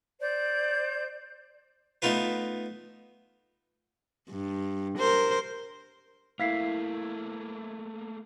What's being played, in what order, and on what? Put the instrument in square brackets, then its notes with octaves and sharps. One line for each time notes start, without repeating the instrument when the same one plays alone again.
[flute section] C5 D5 G6
[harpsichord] A3 B3 D#4 F4 B4
[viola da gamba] G2
A#4 C5
[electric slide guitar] A3 A#3 [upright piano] E4 [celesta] F5 B6 C7